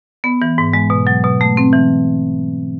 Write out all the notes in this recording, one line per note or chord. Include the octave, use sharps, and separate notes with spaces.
B3
E3
G#2
G#3
B2
F#3
B2
A3
C4
E3